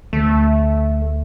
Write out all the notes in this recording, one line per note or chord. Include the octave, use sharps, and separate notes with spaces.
D2 A3